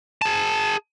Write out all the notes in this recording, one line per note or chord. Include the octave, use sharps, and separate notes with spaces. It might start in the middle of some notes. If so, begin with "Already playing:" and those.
G#4 A5